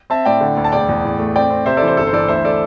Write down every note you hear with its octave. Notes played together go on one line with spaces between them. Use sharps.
C4 E5 A5
A2 D5 G5
D3
D2
A5
E1 D5 G5
E2
A2
A3
C4 D5 G5
C4
C3 C5 E5
A4 D5
E3
C5
G1 A4
C5
E3 A4 D5
D2 C5 E5
A4 D5